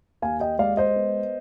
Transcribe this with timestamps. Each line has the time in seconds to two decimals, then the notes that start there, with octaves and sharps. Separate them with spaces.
0.22 D#2 F5 G#5
0.40 D#5 G5
0.59 G#3 D5 F5
0.77 C5 D#5
0.96 B3